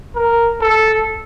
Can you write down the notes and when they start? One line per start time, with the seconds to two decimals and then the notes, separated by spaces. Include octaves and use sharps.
0.16 A#4
0.61 A4